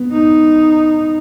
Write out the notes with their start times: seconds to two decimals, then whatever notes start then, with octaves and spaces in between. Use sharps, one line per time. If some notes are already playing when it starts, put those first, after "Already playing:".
Already playing: B3
0.12 D#4